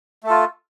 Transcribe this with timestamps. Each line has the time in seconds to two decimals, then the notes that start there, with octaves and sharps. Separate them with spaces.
0.23 A3
0.26 A4
0.30 F4